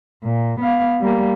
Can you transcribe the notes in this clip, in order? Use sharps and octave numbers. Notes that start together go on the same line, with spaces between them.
A#2
B3 F5
G3 A#3